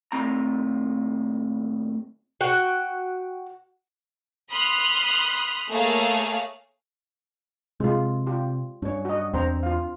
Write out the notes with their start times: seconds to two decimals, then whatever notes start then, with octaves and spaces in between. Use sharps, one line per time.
0.12 D#2 A2 C4 A#5
2.41 F#4 G5
4.50 B5 C6 D#6 F6 F#6
5.70 A3 A#3 G#4 C#5 F5
7.80 C3 G#3 F4
8.27 F4 G4
8.82 G2 C#4 C#5
9.05 F#4 D#5
9.34 E2 C4 D4 C5 A#5
9.63 F4 F5